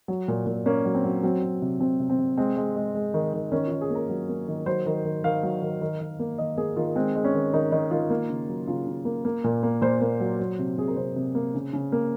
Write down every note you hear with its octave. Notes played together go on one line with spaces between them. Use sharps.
F#3
A#2
A#2
A#3 C#4
F#3
C4
F#3
F#3 C4
F#3
C3
C3 C4
C3
C4
C3
G#3 C4
G#3
G#3
G#3
D#3
D#3
D#3 C#4
D#3 F4
G#4
A#3 A#4
F#3
A#3
D#3
F#3 C5
D#3
D#3
D#3 F5
F#3
D#3
D#3
D#3
A#3
D#3 D#5
A#3 G#4
D#3 F4
G#3 C4
G#3
C#4
D#3
D#3 D#4
D#3 D#4
D#3 F4
A#3
C#3
F#3
C#3 F4
C#3
A#3
A#3
A#2
A#3
A#2 C5
A#3
F#3
F#3
C3
C3 G#4
A#4
C3 C5
C3
A#3
C#3
C#3
A#3